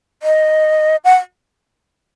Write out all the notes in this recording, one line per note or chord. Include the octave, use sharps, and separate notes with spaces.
D#5
F#5